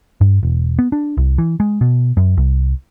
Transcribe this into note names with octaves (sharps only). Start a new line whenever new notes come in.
G2
E1
B3
D4
C2
E3
G#3
B2
F#2
C2